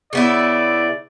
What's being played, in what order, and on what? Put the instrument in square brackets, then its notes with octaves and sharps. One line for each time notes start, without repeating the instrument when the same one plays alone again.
[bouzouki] C#3 B3 E4 [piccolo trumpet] D5